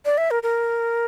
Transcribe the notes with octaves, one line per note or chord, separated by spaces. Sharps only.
D5
E5
A#4
A#4